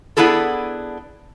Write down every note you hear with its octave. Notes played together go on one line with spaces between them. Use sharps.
B3 D4 E4 G#4 A4